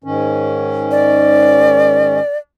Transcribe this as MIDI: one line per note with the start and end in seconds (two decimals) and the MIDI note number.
0.04 2.20 44
0.04 2.20 51
0.04 2.20 61
0.91 2.38 74